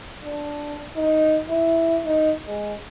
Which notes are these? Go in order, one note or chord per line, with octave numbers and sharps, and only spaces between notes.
D4
D#4
E4
D#4
G#3